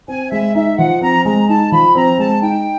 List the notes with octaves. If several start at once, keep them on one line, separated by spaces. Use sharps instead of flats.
C4 G#5
G#3 E5
D#4 E5
F3 F#5
C4 A#5
G#3 A#5
D#4 A5
F3 B5
C4 A#5
G#3 A5
D#4 G5